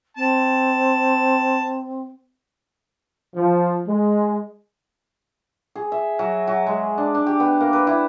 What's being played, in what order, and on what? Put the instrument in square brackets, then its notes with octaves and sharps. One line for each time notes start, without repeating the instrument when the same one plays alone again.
[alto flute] C4 [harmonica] A5
[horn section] F3
G#3
[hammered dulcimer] G#4
E5
F#3
F#3
G#3
D4
D4
G4
B3
A#3
B4
E4